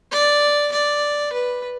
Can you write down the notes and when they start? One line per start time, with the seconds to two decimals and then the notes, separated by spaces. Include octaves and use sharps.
0.12 D5
0.72 D5
1.33 B4